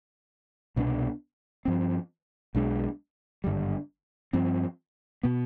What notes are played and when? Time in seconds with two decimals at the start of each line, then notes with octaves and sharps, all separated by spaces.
0.76 C2 B2 B3 D4
1.65 G2 F3 C4
2.55 B1 B2 G#3 D4
3.44 G#1 G2 D3 G3
4.33 G2 F3 C4
5.23 B2 B3